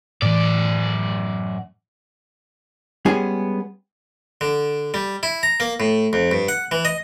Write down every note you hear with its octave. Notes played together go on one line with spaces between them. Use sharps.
F#2 A2 E3 D5
G3 G#3 B3 C#4 G#4
D3
G3
E4
A#5
A#3
A2
F2
G2
F#5
E3
D#5